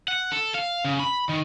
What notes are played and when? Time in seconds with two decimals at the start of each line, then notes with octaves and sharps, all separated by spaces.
0.08 F#5
0.32 A4
0.54 F5
0.85 C#3
1.00 B5
1.29 D#3